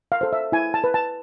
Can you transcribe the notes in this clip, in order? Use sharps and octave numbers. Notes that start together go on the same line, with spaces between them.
F5
A4 C5
E5
E4 G#5
A5
B4
A5